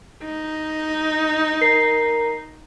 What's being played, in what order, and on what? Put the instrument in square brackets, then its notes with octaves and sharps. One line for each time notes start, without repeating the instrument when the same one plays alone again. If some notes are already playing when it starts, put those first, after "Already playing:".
[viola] D#4
[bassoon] A#4 [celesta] C7